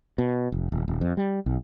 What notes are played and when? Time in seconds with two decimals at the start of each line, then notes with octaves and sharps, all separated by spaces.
0.18 B2
0.52 F1
0.72 D#1
0.88 D#1
1.01 F2
1.17 G3
1.46 B1